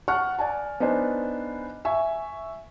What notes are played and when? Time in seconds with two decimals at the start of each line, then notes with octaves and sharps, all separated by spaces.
0.08 F#5 A5 C#6 F6 F#6
0.39 D5 G#5 A5
0.80 B3 D4 D#4 C5 G#5
1.85 E5 G#5 C#6